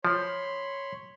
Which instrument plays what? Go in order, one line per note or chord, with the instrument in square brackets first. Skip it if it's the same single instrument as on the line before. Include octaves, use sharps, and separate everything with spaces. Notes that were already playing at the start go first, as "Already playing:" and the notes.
[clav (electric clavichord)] F3 [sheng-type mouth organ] C#5 B5 C6